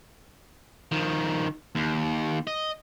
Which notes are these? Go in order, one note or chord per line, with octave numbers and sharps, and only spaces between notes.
D#3 F3
D#2
D#5